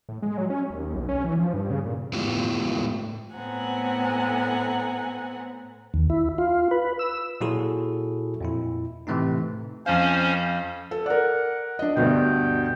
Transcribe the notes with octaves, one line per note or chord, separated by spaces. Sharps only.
A2
G#3
F#3
C#4
D#2
B1
C#4
E3
F3
G2
C#3
A#2
A2 G#3 B3 E4 F4 G4
A2 B3 C4 F#5 G#5 A#5
D#2
E4
F4
B4
E6
A#2 F#3 E4 F#4 G#4 A4
F2 A#2 E4
A2 C3 E3 A3 C4 D#4
F2 C#4 C5 F5
A4
A#4 D5 F#5
D4 D#5
D2 G2 B2 G5